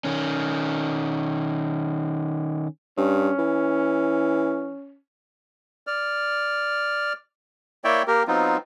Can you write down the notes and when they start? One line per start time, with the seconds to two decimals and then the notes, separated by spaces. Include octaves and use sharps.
0.04 D#3 C#4
2.97 G2 C#4
3.39 E3
5.87 D5 F6
7.84 A#3 E4 C#5 D5 E5 G5
8.08 A#3 G4 A#4
8.28 F#3 B3 C4 D#4 F4